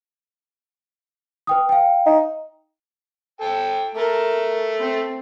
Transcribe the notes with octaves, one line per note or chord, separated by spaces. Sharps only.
B4 G5 D#6
F5 G5
D#4
A4 G5
A3 A#4 A5
C4